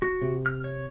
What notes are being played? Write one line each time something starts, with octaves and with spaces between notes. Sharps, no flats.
F#4
C3
F6
C#5